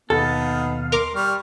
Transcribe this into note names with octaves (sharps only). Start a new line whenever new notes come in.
D#2 B2 B3 D#4 A4 F5
A#4 A#5 C6 D6
G3 C#6 F6